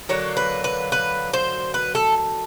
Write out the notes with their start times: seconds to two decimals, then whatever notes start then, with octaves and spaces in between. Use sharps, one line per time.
0.09 D3 F#3 A#3 C#5
0.37 B4
0.64 B4
0.92 B4
1.33 C5
1.74 B4
1.95 A4